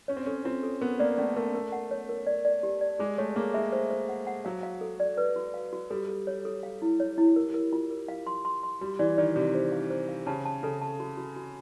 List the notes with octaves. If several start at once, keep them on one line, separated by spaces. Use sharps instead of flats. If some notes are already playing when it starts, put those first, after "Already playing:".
C#4 C#5
C4
C#4 A4
C4 F4
A4
B3 A#4
A#3 D5
A3 C#4
A3 A#4
A#4
F#5
C#5
A#4
D5
D5
G4
D5
G#3 G#4
A3 C#5
A#3 G#4
G#3 E5
C5
C5
F#5
F#5
F#3 F5
F5
A4
D5
B4
F#4
F5
F#4
G3 A4
A4
C#5
A4
F5
E4
C#5
E4
A#4
A#4
F4
A#4
F5
C6
C6
C6
G3 F#4
E3 D5
D#3 D5
C3 F#4
C5
F5
C5
F5
C#3 A5
A5
C#3 A4
A5
F#4
F#4
F#4